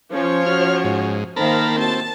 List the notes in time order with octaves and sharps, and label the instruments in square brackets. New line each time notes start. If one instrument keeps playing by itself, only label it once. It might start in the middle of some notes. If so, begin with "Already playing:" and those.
[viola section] F3 C#5 [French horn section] C#4
[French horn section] C#4 F#4 [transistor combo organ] F6
[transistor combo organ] G#2
[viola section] D#3 A#3 F5 [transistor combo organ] A#4 A5 B5 [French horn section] C5
[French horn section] A2 C3 F#4 [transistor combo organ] C4 [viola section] A5